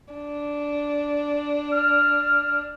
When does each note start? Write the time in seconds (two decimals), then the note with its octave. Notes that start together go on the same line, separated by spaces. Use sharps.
0.13 D4
1.73 F6